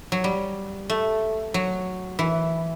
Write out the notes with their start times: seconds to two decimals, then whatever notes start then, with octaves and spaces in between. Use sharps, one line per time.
0.12 F#3
0.24 G3
0.90 A3
1.54 F#3
2.19 E3